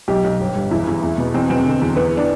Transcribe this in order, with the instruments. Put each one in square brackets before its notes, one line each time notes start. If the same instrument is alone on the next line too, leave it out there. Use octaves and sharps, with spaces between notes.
[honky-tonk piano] B1 G4
B1
G1
G2
E2 E4
E2
E2
B2
E2 C4
B2 C4
D3
E2
E3 B3
D4